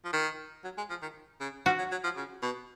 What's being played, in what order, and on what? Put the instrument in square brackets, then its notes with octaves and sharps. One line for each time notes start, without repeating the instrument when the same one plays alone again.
[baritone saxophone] F3
D#3
F#3
G#3
F3
D#3
C#3
[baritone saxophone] F3 [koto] F#4
[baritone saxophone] F#3
F#3
F3
C#3
B2